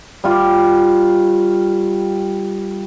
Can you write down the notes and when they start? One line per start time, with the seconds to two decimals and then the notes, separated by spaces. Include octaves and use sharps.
0.24 G3 F4